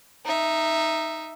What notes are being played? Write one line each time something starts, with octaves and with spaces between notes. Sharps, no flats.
D#4 E5